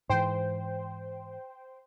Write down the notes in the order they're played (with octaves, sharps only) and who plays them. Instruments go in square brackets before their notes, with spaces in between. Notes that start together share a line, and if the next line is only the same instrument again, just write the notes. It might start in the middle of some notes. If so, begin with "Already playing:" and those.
[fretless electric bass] G#2 E3 [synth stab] C5 G5